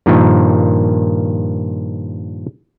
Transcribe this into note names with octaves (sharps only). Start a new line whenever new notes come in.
G2 A#2 D#3 F3